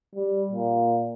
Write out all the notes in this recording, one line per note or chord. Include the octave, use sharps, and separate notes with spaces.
G3
A#2